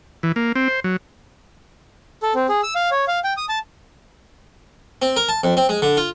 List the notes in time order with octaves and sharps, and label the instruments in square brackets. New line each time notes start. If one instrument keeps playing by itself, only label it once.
[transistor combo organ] E3
A#3
C4
C5
F#3
[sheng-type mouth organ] A4
C4
G#4
E6
F5
C#5
F5
G5
D#6
A5
[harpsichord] C4
A#4
A5
F2
C4
G#3
D3
F4